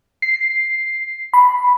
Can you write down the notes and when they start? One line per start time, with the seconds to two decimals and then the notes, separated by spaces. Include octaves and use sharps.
0.22 C7
1.34 B5